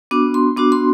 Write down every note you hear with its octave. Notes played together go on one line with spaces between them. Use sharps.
B3 D4 F#4 D6
C6
B3 D4 F#4 D6
C6